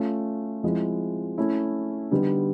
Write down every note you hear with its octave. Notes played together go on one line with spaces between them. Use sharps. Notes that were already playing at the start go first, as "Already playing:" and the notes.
Already playing: A3 C#4 F4
F3 G#3 C4 E4
A3 C#4 E4
D3 G3 B3 D#4